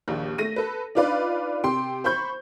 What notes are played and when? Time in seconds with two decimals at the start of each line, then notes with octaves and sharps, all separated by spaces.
0.08 A#1 D#2
0.38 A3 A#6 D#7
0.56 A4 B4
0.95 D4 D#4 F4 B4 D5
1.63 C3 G5 C6
2.04 C5 B5 C#6 G6